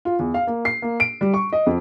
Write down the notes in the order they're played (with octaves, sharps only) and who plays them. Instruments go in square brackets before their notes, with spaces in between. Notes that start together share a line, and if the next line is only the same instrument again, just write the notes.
[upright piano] F4
E2
F5
A#3
C7
A#3
D7
G3
C#6
D#5
F2